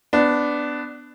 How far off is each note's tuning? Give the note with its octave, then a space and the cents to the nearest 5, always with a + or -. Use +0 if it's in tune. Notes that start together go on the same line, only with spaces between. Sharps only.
B3 +15 D4 +0